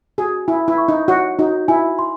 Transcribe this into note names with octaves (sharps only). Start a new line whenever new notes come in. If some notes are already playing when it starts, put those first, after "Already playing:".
F#4 G#4
E4 G#5
E4
C#6
D#4
F#4 C#5
D#4 F#4
E4 G#5
C6